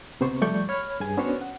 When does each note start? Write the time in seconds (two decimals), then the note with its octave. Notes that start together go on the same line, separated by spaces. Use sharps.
0.20 C#2 C3 B3 C5 C#6
0.41 F3 G3 A3 D5 C#6 G6
0.69 C#5 B5 F6 G#6
1.00 G2 G#4 G#5
1.17 B3 C#4 D4 F#4 C5 C#5
1.41 F#5